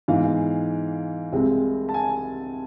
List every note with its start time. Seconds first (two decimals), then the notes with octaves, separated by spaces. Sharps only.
0.08 G#2 E3 B3 F5
1.32 C2 C3 G#3 C4
1.89 A5
1.94 G#5